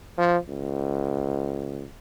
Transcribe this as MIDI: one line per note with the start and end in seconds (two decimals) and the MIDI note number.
0.18 0.37 53
0.49 1.85 37